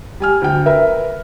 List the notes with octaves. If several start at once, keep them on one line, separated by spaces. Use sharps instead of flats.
G3 G#5 F6
D2 G5
A#4 B4 E5